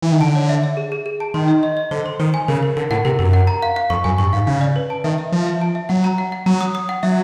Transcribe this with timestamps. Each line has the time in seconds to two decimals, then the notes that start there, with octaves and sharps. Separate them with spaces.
0.02 E3
0.12 D#3
0.21 D3 A5
0.35 C#5
0.49 E5
0.64 E5
0.77 G#4
0.92 G#4
1.06 G#4
1.20 A5
1.34 D#3 C6
1.48 D#5
1.63 D#5
1.77 D#5
1.91 D3 C5
2.06 C6
2.20 D#3 C5
2.34 G#5
2.48 C#3 A#4
2.63 A#4
2.77 D3 A#4
2.91 A2 F#5
3.05 C3 A#4
3.19 F#2 A#4
3.33 F#5
3.47 A#5
3.62 F5
3.76 F5
3.90 F2 C#6
4.04 F#2 G#5
4.18 G2 C#6
4.33 G#2 F5
4.47 C#3 F5
4.61 D5
4.76 B4
4.90 A5
5.04 D#3 E5
5.18 E5
5.32 F3 E5
5.46 E5
5.61 A5
5.75 E5
5.89 F#3 F#5
6.04 A#5
6.18 F#5
6.32 F#5
6.46 F#3 A#5
6.61 D#6
6.75 D#6
6.89 F#5
7.03 F#3 E5